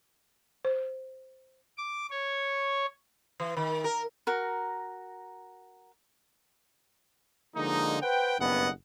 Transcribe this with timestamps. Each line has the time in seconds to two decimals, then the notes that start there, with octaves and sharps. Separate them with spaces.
0.65 C5
1.78 D6
2.10 C#5
3.40 E3
3.57 D#3
3.84 A#4
4.27 F#4 A#4
7.56 D3 F3 G#3 A#3 D#4
8.02 B4 C5 F#5 G5
8.39 F#1 G2 B2 B3 D#5 F#5